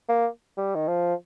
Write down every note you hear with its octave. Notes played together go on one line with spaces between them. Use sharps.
A#3
G3
D#3
F3